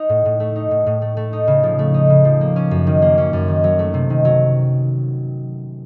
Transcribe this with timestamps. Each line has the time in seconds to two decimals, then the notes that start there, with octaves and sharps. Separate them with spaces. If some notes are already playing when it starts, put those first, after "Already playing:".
Already playing: D#4
0.09 A2
0.25 A2
0.40 A3
0.56 D#4
0.71 A2
0.86 A2
1.02 A3
1.17 A3
1.33 D#4
1.47 C#3
1.63 F3
1.79 A3
1.94 D#4
2.10 C#3
2.25 F3
2.41 A#3
2.56 C#4
2.71 F#2
2.87 D#3
3.02 A#3
3.18 C#4
3.33 F#2
3.48 D#3
3.64 F#3
3.79 A3
3.94 C3
4.10 D#3
4.25 F#3